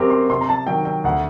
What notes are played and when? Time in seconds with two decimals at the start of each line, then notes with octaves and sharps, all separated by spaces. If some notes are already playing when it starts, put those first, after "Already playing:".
Already playing: F#2 F#3 C4 G4 A#4
0.10 C6
0.29 C3 C6
0.41 A#5
0.49 A5
0.67 D#3 F#3 G5
0.85 G5
1.04 D2 F#5